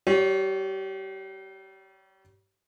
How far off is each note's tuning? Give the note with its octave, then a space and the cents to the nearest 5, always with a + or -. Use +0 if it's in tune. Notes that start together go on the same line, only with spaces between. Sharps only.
G3 -30 C#5 +0